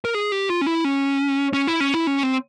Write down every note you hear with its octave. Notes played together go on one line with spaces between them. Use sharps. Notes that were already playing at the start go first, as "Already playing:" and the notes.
A#4
G#4
G4
F4
C#4
E4
C#4
C#4
E4
C#4
E4
C#4
C4